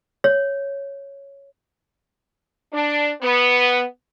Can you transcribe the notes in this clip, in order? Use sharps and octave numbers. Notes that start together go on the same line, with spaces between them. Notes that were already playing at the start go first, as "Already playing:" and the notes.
C#5
D4
B3